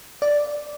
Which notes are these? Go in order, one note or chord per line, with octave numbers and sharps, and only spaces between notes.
D5